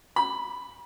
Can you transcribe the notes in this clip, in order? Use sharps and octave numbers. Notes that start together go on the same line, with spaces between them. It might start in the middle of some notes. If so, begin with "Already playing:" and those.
B5